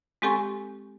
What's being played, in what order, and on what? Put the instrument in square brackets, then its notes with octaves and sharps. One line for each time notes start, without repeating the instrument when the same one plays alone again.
[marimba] G#3 C4 G4 A4 G#5 C#6